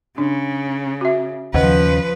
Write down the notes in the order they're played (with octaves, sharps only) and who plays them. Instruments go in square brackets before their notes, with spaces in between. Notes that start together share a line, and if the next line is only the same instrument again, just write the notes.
[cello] C#3 [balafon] D4
[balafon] F#4 E5
[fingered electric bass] D#2 C#3 [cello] F3 B4 [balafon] C5 D#5 F#5